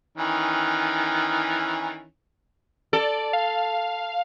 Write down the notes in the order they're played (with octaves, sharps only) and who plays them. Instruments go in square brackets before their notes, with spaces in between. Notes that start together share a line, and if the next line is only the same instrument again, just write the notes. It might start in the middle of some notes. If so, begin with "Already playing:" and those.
[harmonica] D#3 E3 C#4
[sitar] A4 [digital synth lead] D5
[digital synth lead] F5